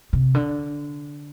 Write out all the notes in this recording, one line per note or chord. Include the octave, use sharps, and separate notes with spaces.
C3
D3